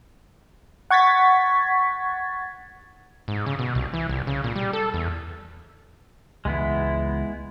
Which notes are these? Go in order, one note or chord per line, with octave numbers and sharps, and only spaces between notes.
F#5 C#6 G#6 A6 B6
G#2
C#3
B2
C2
E3
C2
C#3
A#2
G3
A4
E2
C#2 E3 G#3 B3 E4